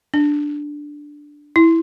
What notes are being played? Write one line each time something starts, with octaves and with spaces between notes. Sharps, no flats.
D4
E4